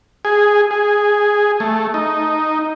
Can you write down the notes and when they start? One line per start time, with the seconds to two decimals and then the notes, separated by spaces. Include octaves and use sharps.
0.25 G#4
0.71 G#4
1.60 A3
1.94 D#4